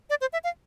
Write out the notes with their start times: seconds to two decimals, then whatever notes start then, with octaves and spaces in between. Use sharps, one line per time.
0.10 D5
0.21 C5
0.33 E5
0.44 F5